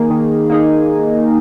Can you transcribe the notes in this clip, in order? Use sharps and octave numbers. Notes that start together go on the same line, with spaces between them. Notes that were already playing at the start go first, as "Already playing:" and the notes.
Already playing: D#3 A#3 D#4 G#4
D#3
A#3 D#4 G#4